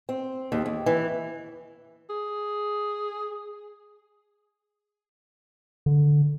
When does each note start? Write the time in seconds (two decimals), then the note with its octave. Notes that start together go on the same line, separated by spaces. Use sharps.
0.09 C4
0.52 D#2
0.66 D#2
0.86 E3
2.10 G#4
5.86 D3